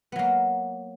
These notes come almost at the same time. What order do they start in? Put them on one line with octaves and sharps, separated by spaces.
B3 F#3 A#3